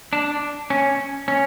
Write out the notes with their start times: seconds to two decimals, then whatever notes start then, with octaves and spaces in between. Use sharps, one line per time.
0.13 D4
0.70 C#4
1.28 C#4